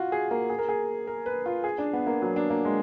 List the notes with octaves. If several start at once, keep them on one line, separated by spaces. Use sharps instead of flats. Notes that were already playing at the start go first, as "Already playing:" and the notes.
Already playing: F4 F#4
G#4
A#3
G#4
A#4
G#4
A#4
B4
F4
G#4
D4
B3
A#3
F#3
D4
A#3
G#3